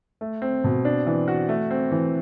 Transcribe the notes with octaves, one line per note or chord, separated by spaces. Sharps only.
A3
C4
B2
D4
E3
F#4
A3
C4
E3